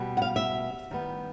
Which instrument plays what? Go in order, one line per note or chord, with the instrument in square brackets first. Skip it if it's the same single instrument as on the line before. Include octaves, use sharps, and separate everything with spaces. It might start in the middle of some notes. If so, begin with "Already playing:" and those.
Already playing: [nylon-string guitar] B2 G3 B3
F#5
F5
E5
D#3 G3 B3